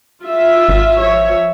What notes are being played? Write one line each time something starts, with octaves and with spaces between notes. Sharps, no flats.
F4 E5
G#1
F3 C#5 E5